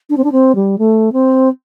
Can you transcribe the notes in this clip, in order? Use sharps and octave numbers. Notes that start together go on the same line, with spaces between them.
D4
C4
D4
C4
G3
A3
C4